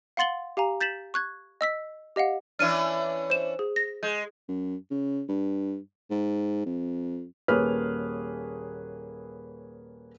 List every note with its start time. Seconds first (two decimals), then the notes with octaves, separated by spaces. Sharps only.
0.17 F5 F#5 C6 A6 F#7 G7
0.57 G4 F5 G#5 A#5
0.81 G6 A6 B6 E7 F#7
1.14 C#6 F#6 G#6
1.61 D#5 E6 B6
2.16 G4 D#5 F5 F#5
2.59 E3 C#4 D4 F6 D#7
3.30 C5 E7
3.59 G#4
3.76 A#6
4.03 G#3 G6
4.49 F#2
4.91 C#3
5.29 G2
6.10 G#2
6.66 F2
7.48 D#1 A#3 G#4 B4 C#5 F6